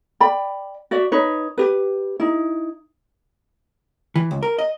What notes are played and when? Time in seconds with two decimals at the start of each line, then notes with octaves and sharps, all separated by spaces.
0.20 D5 G5 B5
0.91 F#4 D5 E5
1.12 D#4 B4 C#5
1.58 G4 B4
2.20 D#4 E4
4.16 E3
4.31 C#2
4.43 A#4
4.59 D#5